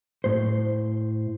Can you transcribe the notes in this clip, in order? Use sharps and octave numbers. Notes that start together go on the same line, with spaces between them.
A2 C5